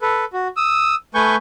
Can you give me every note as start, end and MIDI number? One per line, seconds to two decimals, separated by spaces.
0.02 0.25 69
0.02 0.25 71
0.33 0.48 66
0.57 0.95 87
0.57 0.95 88
1.15 1.36 57
1.15 1.36 71
1.15 1.36 80
1.15 1.36 85
1.15 1.36 91